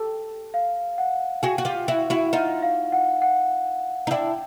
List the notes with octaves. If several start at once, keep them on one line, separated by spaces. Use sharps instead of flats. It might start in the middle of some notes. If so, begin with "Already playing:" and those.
Already playing: G4 A4
F5
F#5
F#4 G#4 G5
F#4
F4 G4
E4 F#4
E4 F#4
D#4 F4 F#5
F5
F#5
F#5
D#4
D4 E4 G5